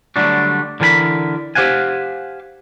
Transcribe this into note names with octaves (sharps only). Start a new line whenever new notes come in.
D3 F#3 G3 A3 D4
D3 E3 A#4 G#5 B5
G4 C5 F5 F#5 G#5